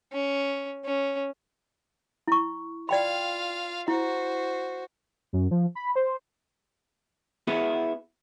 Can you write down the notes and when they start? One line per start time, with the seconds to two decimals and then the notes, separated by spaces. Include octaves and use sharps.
0.12 C#4
0.85 C#4
2.28 E4 C#6
2.89 F4 D5 F5 G5 B5
3.88 E4 F#4 C5
5.33 F#2
5.51 F3
5.75 B5
5.96 C5
7.47 B3 E4 F#4 G#4